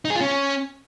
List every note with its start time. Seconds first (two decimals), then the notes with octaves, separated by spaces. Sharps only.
0.05 D#4
0.10 G#4
0.16 F4
0.21 C#4